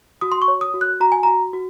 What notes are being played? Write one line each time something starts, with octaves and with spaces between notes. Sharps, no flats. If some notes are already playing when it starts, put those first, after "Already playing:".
F#4 D#6
C6
C#6
C#5
D#6
F#4
F#6
F#4 A#5
G#5
F#4 A#5
F#4